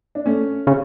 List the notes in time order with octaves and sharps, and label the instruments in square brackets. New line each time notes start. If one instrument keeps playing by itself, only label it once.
[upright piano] D4
A3 C#4
[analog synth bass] C#3